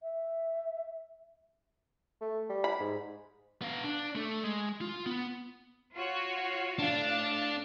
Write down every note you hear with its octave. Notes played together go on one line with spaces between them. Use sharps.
E5
A3
G3
B5
G#2
B3 F5
D4
A3 A4
G#3
F4
B3
F4 F#4 C#5
A2 D4 F5 A6